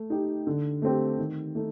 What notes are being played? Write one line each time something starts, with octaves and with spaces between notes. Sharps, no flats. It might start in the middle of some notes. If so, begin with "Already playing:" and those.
Already playing: A3
D#4 G4
D3
A3 C4 G4
D#3
A3 D#4